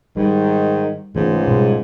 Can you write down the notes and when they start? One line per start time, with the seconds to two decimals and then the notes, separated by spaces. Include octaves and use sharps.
0.17 G#2 D#3 G3
1.16 C#2 G#2 E3 A3
1.47 B2 G3